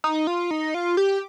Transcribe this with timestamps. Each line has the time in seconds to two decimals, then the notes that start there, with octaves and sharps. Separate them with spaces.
0.04 D#4
0.27 F4
0.51 D#4
0.74 F4
0.97 G4